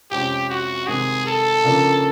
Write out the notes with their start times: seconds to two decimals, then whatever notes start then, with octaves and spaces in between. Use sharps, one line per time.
0.11 F2 C3 F3 G#3 C#4 G4
0.49 F#4
0.87 C3 D#3 G#3 G#4
1.27 A4
1.64 C#3 F3 A#3 D4